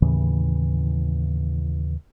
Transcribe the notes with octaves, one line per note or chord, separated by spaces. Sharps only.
D#2 A2 C#3 E3